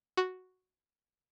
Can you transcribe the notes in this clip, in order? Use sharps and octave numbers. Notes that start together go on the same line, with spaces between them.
F#4